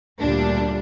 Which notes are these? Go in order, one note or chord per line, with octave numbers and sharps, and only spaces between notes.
D2 A#2 G3 D4